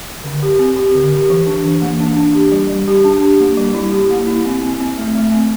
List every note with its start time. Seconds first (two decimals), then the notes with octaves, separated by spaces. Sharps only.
0.24 D3
0.42 G4
0.59 C4
0.76 G4
0.94 D3
1.13 G4
1.30 E3
1.46 D4
1.64 E3
1.82 A#3
2.00 D4
2.16 D4
2.35 G4
2.52 G3
2.70 G3
2.88 G4
3.04 D4
3.22 G4
3.40 A#3
3.57 G3
3.74 E4
3.92 G4
4.10 A#3
4.27 E4
4.45 C4
4.62 C4
4.80 C4
4.98 A3
5.15 A3
5.32 C4